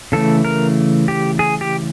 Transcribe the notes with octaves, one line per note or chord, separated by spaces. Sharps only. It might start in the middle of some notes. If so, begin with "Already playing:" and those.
C#3 E3 A3 A4
A#4
G4
G#4
G4